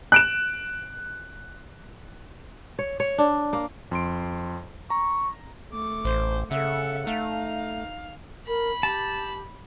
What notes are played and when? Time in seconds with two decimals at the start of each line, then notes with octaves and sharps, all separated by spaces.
0.12 F#6 D7 E7
2.79 C#5
3.00 C#5
3.18 D4
3.53 A#3
3.91 F2 C6 D7
4.90 A#5 C#6
5.72 A3 D6
6.05 A1 C5
6.51 C#3 A4 E5 F#5
7.07 A3 D#4 F5
8.47 A#4 B5
8.83 G4 A5